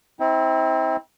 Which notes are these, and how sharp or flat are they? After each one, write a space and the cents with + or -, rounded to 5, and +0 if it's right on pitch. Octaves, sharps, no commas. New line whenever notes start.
C4 +0 E4 -45